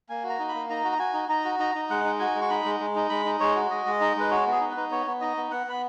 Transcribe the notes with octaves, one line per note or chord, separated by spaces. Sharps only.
A#3 G#5
F#4
A#5
D#4
B5
A#3
D#4 A#5
F#4
A#5
F#4 G#5
D#4
D#4 A#5
F#4
D#4 A#5
D#4
G#3 F#5
D#4
F#4 G#5
G#3
C#6
D#4 B5
G#3
G#3
D#4
G#3 B5
D#4
G#3 C#5
F#4
G#3 D#5
G#3
D#4
G#3 B4
F#4 C#5
B3 G#4
D#4
B4
D#4
B3 C#5
B3
D#4 D#5
B3
B3 F#5
B3 B5